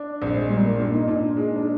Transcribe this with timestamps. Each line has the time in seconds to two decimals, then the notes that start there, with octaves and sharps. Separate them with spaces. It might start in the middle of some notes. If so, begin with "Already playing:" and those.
Already playing: D4
0.22 A#1 C4
0.36 G#3
0.50 A#2 G3
0.65 A#3
0.79 A#2 D4
0.94 D#4
1.07 A#2 D4
1.36 G#3 D#4
1.56 D4